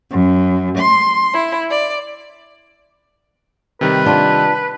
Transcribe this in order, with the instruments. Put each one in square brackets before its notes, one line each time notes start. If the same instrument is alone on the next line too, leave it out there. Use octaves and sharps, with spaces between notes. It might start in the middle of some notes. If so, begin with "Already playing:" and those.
[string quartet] F#2
C6
E4
D5
[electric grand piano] C3 D#3 G3 [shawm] B4
[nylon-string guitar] D4 F4